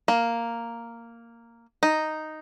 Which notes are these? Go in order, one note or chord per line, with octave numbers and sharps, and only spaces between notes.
A#3
D#4